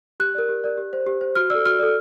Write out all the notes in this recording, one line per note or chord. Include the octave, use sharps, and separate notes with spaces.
G4 F#6
A#4 D5
G4
A#4 D5
G4
C5
G4
C5
F#4 F6
A4 D5 E6
F#4 F6
A4 D5